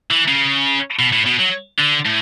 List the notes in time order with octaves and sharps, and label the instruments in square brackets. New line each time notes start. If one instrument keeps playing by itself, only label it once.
[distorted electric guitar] E3
C#3
B2
A2
B2
F#3
D3
A2